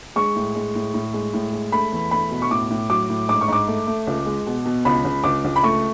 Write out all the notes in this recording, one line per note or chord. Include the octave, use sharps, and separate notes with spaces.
G#3 C#6
A2
G#3
A2
A2
G#3
A2
G#3
A3 B5
E2
A3 B5
B2
C#6
A2 D6
A2
F#3 D6
A2
G#2 D6
C#6
G#2 D6
A3
A3
C#2
G#3
B2
B2
C#2 B5
C#2
C#2 D6
C#2
B5
A3 C#6